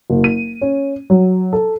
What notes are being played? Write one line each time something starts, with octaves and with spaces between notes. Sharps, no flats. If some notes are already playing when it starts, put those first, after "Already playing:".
F#1
D#7
C#4
F#3
A4